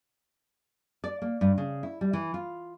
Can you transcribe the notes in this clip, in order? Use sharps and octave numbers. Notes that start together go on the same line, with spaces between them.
D5
A#3
G2
C#3
E4
G3
E3
F4